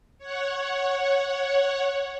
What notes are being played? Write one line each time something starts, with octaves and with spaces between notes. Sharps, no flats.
C#5 F#5